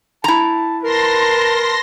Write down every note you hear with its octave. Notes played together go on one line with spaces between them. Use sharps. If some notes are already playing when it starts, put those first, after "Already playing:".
E4 A5 A#5
A#4 B4 A5 C6 A#6